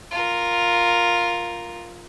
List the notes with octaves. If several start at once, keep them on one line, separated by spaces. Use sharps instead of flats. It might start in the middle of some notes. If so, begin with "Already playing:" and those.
F4 A#4